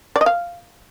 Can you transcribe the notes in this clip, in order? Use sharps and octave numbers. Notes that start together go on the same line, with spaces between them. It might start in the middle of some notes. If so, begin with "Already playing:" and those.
D5
D#5
F5